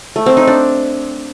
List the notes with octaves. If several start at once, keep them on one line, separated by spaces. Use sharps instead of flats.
A3
C4
D#4
D4